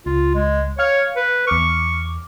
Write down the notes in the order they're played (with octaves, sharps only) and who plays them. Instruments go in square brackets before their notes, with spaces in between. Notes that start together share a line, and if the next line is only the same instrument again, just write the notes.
[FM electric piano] C#2 [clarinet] F4
[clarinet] G#3
[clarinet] C#5 [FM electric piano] F5 F6 C#7
[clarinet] B4
[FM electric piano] E2 D6 F6 [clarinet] C#6